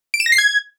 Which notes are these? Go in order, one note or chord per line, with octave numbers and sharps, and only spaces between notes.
D7
E7
A#6
C7
G#6